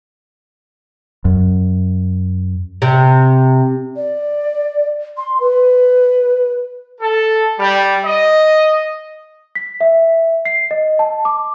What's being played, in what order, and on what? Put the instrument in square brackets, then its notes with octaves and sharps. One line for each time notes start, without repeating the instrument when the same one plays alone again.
[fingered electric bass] F#2
[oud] C3
[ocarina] D5
C6
B4
[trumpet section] A4
G3
D#5
[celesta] B6
E5
C7
D#5
A5
D6